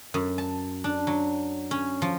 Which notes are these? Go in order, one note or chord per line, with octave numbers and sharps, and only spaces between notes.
F#2
A5
D4
F#3
C#4
F3